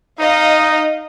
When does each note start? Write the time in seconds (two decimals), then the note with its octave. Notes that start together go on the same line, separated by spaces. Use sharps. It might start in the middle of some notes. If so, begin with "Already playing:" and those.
0.19 D#4 D#5 F5